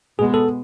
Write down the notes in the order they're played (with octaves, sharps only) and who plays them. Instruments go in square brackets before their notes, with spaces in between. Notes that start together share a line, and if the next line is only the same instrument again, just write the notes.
[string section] B2 G#3 B3 [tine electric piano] G#4
[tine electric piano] A4